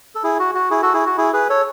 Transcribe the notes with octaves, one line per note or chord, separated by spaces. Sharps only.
A4
E4 G#4
F#4
F#4
E4 G#4
F#4 A4
E4 G#4
F#4
E4 G#4
G#4 B4
A4 C#5